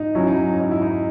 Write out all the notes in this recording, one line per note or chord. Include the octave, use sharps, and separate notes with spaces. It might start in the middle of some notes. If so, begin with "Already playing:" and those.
Already playing: G#2 D#4
F#3 C#4 E4
D#4
C#4
G#2 D#4
E4
D#4